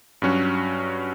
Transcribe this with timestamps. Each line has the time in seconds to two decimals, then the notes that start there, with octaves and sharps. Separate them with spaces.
0.22 G2 F#3 C#4 F#4